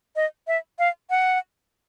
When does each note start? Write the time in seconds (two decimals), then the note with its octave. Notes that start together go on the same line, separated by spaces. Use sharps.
0.16 D#5
0.47 E5
0.79 F5
1.10 F#5